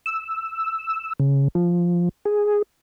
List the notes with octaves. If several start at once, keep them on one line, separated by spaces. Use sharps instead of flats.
E6
C#3
F3
G#4